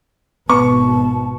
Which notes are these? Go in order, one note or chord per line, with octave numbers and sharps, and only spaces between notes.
G#1 B2 B3 A5 C#6